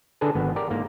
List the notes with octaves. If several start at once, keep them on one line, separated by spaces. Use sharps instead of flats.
D3 D4 G#4 A4 B4
G#1 B3
G4 A#4 D5
G#2 A#3